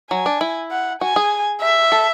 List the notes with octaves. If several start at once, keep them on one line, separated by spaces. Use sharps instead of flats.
F#3 G#5
D4
E4
F#5
F#4 G#5
G#4
E5
A4